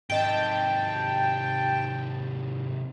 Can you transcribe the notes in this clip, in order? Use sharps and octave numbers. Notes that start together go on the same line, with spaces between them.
G#2 C3 D#3 D#5 G5 A5 D7